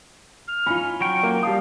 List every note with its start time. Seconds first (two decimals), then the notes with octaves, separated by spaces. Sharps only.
0.48 F6
0.66 C#4 D#4 F4 B5
1.01 F#3 G5 C#6
1.23 A#3
1.43 G3 F5 A5 D#6